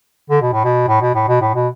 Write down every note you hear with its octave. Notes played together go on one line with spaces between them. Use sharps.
D3
B2
A2
B2
A2
B2
A2
B2
A2
B2